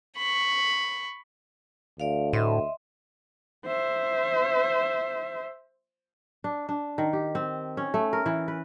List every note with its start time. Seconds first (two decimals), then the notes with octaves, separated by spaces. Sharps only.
0.17 B5 C#6
2.00 D2 D5 F5
2.33 A2 D#5 E5 C6
3.66 C5 E5
6.44 D4
6.69 D4
6.98 D#3
7.13 G4
7.35 C4
7.77 C#4
7.94 A3
8.13 A#4
8.26 E3
8.48 B4